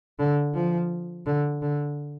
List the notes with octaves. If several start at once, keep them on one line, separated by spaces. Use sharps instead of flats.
D3
F3
D3
D3